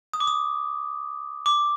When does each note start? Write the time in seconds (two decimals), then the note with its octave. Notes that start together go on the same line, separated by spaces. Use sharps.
0.13 D#6
0.20 D6
0.27 D#6
1.46 D6